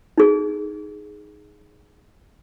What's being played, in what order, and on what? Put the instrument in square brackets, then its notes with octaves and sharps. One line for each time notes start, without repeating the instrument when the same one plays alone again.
[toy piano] D#4 G#4